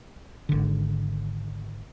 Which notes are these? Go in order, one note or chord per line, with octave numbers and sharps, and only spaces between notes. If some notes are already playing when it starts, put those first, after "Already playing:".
G#1 D3